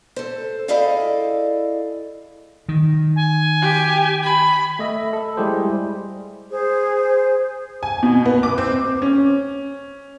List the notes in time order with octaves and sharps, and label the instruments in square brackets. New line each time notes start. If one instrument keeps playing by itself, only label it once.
[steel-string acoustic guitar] A4 C5
E4 G#4 A4 D5 D#5 F5
[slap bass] D#3
[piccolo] G#5
[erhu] G4
B5
[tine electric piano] A3 D#5 E5
A4
G3 G#3 E4 G4 G#4 C5
[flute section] G#4 C5
[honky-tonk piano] G#5
B2
B3
D6
C4
[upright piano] C#4